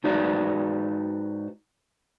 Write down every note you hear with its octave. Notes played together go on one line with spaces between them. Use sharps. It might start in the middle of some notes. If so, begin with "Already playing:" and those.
G#2 D#4 F#4 B4 D5